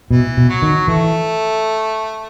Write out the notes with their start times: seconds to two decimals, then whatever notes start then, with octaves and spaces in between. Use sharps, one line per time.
0.11 B2 E3
0.37 B2
0.49 F#3
0.62 D#3
0.88 E3 A3